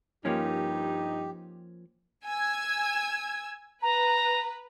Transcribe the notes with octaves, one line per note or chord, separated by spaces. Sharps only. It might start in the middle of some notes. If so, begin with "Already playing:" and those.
G2 F3 A#3 C#4 D#4 G4
G#5 E6 G#6
B4 A#5